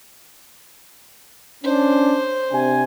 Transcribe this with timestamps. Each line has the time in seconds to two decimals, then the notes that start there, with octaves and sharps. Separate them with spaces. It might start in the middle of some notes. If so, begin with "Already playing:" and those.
1.64 C#4 D4 C5
2.52 C3 D4 G#5